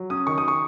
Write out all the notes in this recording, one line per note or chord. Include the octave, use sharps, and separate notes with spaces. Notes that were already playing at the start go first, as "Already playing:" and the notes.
Already playing: F#3
C#4 D#6
D#3 C#6
D#6
C#6